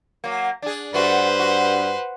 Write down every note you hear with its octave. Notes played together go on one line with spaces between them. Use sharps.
F#3 A#3
D4 G#4
G2 A3 F#4 B4 C5
F#4